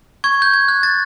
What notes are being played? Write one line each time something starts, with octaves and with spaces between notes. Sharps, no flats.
C#6 G#6
G6
G#6
F#6
A6